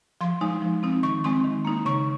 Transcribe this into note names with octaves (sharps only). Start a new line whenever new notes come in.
F3 C6
G#3 D#4
F3
C4 D#4
D#3 C#6
G#3 C4 D#4 C6
D#3
A#3 D#4
C#3 C#6